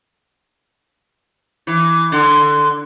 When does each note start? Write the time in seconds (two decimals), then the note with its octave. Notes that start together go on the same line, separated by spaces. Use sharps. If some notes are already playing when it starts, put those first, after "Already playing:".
1.67 E3
2.12 D3